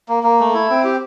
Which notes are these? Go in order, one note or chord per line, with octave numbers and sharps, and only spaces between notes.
A#3
A#3
A3
E4
C4
G4